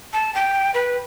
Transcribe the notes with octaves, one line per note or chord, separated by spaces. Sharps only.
A5
G5
B4